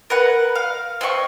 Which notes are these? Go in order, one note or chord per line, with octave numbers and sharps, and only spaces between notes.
A#4 B4 F#5
F5
C4 D#5 F#5 C#6